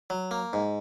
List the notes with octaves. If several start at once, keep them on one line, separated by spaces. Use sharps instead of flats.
F#3
A#3
G#2